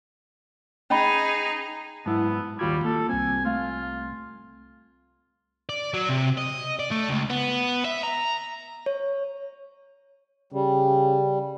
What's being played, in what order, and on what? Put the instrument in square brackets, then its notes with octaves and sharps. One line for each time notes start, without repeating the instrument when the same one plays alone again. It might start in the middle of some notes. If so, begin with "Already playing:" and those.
[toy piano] C#4 D#5 B5 [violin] D#4 G#4
[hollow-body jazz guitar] G#2 F#3 E4 [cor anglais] B3 [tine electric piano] A5
[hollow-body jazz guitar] D#2 F#4 B5 [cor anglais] G3 [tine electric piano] F4 G#6
[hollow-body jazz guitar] A#3 [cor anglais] A4
[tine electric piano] C2 G3 C4 [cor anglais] G#5
[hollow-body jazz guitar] A3 F5 [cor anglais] F4
[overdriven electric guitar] D5
F#3
C3
D#5
D5
A3
C#2
B3
E5
A#5
[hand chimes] C#5
[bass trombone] C#3 [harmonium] G3